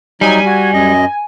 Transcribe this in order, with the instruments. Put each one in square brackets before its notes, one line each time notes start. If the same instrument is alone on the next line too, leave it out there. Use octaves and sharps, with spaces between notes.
[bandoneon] F#3 D#4 [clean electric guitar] G3 [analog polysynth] G#5
[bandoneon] F#4
F#2 D#5